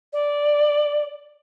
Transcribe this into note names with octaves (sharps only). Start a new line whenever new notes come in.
D5